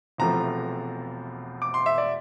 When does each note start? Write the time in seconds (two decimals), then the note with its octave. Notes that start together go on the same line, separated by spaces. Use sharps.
0.18 E1 E2 C3 F3 A3 A#5
1.62 D6
1.74 C6
1.86 E5
1.98 D5